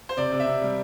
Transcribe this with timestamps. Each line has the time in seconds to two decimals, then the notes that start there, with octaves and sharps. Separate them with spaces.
0.09 C5
0.17 C3 D5
0.32 C3
0.40 E5
0.46 C3
0.62 G3